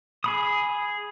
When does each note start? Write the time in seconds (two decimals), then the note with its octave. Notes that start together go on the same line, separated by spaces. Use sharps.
0.24 G#4 B5 D#6